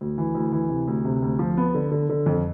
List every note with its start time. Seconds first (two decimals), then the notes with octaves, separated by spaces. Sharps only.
0.01 D2
0.18 E3
0.35 D2
0.52 E3
0.69 C3
0.88 D2
1.05 C3
1.22 D2
1.39 F3
1.57 B3
1.74 D3
1.91 D3
2.09 D3
2.26 F2